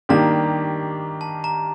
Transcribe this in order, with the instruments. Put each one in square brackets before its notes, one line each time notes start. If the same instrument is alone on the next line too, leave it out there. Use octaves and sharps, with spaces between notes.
[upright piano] D#3 G3 A#3 D4 G4 [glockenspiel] A#5
[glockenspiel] A5
A#5